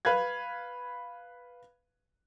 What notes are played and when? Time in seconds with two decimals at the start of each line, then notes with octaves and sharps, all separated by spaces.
0.05 B4 F5 F#6 G#6